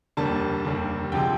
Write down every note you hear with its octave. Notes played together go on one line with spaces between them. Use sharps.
F1 D#2 D3 G3 A#3 A5
F1 D#2 D3 G3 A#3
D2 C3 F3 G#3 G5